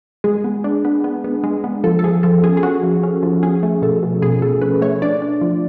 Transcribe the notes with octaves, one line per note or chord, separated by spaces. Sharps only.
G#3 G#4
B3
D4
B3
B3
B3
G#3
B3
F3 A4
A4
F3 G#4
F3 A4
C#4 G#4
G#4
C#4 F#4
F3
C#4
F3
C#4 G#4
A3
B2 A4
B2
B2 G#4
B2 A4
C#4 B4
A3 C#5
D4 D5
D4
F3